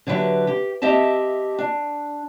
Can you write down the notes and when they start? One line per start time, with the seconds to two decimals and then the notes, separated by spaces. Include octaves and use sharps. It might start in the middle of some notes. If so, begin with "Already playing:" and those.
0.07 D3 F#3 G4 B4 E5
0.47 G4
0.82 C4 G4 D#5 E5 A5
1.59 D4